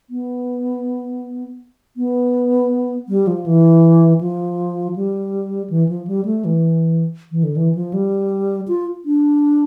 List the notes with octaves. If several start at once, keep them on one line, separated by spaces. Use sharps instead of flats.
B3
B3
G3
F3
E3
F3
G3
E3
F3
G3
A3
E3
E3
D3
E3
F3
G3
F4
D4